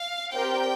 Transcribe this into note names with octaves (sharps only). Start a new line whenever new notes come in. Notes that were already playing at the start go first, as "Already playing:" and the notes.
Already playing: F5
C4 G4 A#4 D5 G5